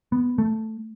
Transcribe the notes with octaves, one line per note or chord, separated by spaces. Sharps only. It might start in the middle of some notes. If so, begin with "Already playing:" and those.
B3
A3